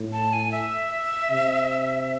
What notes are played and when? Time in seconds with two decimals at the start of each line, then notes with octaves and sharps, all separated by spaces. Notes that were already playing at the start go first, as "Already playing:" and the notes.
Already playing: A2
0.13 A5
0.33 G#5
0.52 E5
1.31 C3